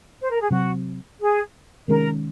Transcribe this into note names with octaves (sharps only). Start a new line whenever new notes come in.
C5
A#4
G#4
C3 F#3 C4 F#4
G#4
C3 D#3 G#3 C#4 A#4